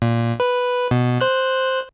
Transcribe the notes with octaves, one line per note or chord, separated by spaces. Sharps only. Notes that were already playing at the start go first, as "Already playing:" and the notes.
A#2
B4
B2
C5 F#6